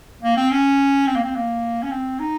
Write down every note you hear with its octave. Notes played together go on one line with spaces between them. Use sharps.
A#3
C4
C#4
C4
A#3
C4
A#3
C#4
C4
D#4